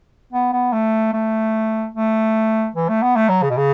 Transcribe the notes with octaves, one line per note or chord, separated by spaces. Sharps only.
B3
B3
A3
A3
A3
E3
A3
B3
A3
F#3
C#3
B2
C#3